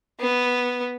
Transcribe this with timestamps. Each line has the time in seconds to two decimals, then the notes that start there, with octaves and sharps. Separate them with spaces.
0.20 B3